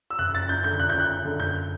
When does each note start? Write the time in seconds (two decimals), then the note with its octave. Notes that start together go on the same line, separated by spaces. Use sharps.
0.10 E6
0.18 F#1 F#6
0.33 F#1 A6
0.49 F#2 G6
0.64 D3 G6
0.79 F#1 F#6
0.90 F#1 G6
1.00 F#6
1.10 F#2
1.25 D3
1.40 F#1 G6